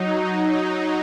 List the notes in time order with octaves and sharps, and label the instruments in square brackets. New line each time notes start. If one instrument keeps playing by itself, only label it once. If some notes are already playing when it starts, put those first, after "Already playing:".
Already playing: [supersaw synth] F#3 D#4